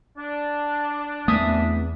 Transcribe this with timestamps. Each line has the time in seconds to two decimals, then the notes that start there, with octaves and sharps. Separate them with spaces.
0.18 D4
1.28 E2 A3 B3 C4 E5 G#5 D#6